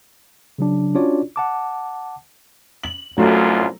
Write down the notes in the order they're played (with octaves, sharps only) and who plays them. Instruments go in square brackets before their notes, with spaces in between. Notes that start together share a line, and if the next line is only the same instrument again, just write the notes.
[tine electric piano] C#3 F#3 D4
C#4 D4 F4 F#4 C#5 D5
F#5 A5 D6
[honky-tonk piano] F#7
[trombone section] C2 F#2 F4 [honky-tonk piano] F#3 A3